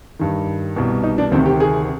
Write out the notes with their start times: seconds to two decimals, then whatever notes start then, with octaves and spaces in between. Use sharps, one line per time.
0.19 G2 D#3
0.76 C2 B2
1.04 D#4
1.18 D4
1.31 D2 C3 D#3 C4
1.46 G4
1.60 G#4